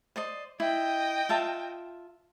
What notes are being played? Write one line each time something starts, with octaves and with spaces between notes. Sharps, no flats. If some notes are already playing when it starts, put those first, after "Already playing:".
C5 D5 D#5
E4 D#5 G5
F4 E5 A5